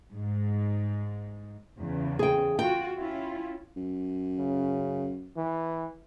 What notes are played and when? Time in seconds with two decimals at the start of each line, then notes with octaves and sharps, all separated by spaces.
0.11 G#2
1.79 E2 C#3
2.19 G#4 G5
2.59 F4 F#4 G5
2.99 C#4 E4 F4
3.76 F#2
4.39 C#3
5.37 E3